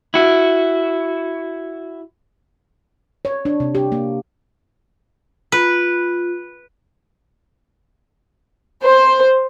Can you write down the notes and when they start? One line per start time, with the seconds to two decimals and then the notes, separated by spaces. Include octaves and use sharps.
0.14 E4 F#4
3.25 C#5
3.45 D4
3.60 C3
3.75 G4
3.92 A#3
5.52 F4 B4
8.83 C5